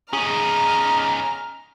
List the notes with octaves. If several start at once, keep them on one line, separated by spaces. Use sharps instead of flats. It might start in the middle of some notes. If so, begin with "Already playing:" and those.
C#4 D#4 G#4 A#5 F6